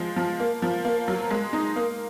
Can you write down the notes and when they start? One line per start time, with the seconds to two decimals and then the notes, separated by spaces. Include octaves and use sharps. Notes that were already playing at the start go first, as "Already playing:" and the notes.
Already playing: F3 G#3
0.16 F3
0.40 A#3
0.62 F3
0.85 A#3
1.08 F#3
1.30 G#3
1.53 D#4
1.76 A#3